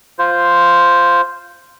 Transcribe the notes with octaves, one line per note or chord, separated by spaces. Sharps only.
F4 C5